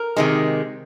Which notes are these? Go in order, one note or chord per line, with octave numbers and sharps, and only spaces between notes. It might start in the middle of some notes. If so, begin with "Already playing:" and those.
Already playing: A#4
C3 D#3 G#3